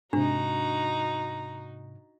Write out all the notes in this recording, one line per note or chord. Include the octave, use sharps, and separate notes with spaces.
G#2 C3 D4 D#4 F#4 A#5